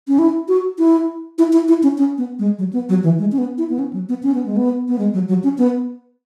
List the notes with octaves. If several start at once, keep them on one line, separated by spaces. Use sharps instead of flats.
C#4
E4
F#4
E4
E4
E4
E4
C#4
C#4
B3
G#3
F#3
B3
F#3
E3
G#3
C#4
B3
E4
B3
C#4
F#3
B3
C#4
B3
G#3
B3
B3
G#3
F#3
F#3
C#4
B3